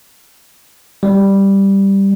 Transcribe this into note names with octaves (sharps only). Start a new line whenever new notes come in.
G3